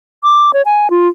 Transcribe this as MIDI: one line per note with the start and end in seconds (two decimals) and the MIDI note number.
0.23 0.51 86
0.53 0.62 73
0.65 0.90 80
0.90 1.08 65